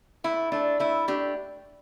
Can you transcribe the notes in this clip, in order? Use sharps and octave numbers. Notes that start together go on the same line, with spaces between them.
A3 E4
A3 D4
A3 E4
A3 D4 G4